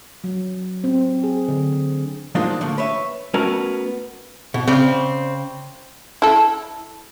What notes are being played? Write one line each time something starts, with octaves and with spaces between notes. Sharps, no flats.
F#3
C4
G#4
D3
F3 G#3 A#3 D4 D#4 F4
D3 A3 A#3
B4 C#5 E5
A3 B3 C#4 F#4 A#4
B2
C#3 C4 D5
E4 A4